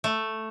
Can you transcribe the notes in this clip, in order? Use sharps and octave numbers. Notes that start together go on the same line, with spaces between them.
A3